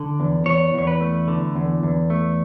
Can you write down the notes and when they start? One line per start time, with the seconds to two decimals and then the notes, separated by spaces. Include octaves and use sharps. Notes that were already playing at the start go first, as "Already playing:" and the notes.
Already playing: D3
0.20 E2
0.46 E2 C#5
0.74 E2 C#5
0.87 B4
1.01 A3
1.28 D3
1.55 E2
1.83 E2
2.10 A3